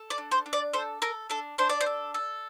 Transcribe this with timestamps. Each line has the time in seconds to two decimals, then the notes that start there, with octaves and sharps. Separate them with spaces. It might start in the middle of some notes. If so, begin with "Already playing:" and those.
Already playing: A4
0.10 D5
0.18 D4
0.31 C5
0.46 D4
0.53 D5
0.73 A4 C5
1.02 A4 A#4
1.30 D4 A4
1.58 D4 C5
1.69 D5
1.81 C5
1.86 A4
2.14 A4